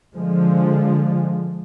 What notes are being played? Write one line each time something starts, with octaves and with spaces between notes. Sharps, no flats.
D3 F3 G#3